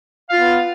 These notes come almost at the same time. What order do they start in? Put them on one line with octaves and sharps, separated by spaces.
F5 F4 B3